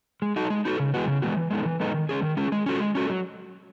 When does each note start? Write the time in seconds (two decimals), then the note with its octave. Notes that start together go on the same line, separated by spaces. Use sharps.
0.22 G#3
0.36 D#4 F#4 A4
0.50 G#3
0.65 D#4 F#4 A4
0.80 C#3
0.94 E3 G#3 B3 F#4
1.07 C#3
1.22 E3 G#3 B3 F#4
1.37 E3
1.50 G#3 B3 D#4 A4
1.66 E3
1.80 G#3 B3 D#4 A4
1.94 D#3
2.09 G#3 C#4 G#4
2.22 D#3
2.37 G#3 C#4 G#4
2.52 G#3
2.66 C#4 F#4 A4
2.80 G#3
2.95 C#4 F#4 A4
3.10 F#3